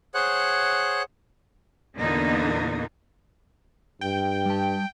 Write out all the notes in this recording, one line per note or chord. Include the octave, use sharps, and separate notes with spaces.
G#4 C5 C#5 F#5 F#6
E2 A#2 D3 A#3 B3 D#4
G2 G5
G3 A5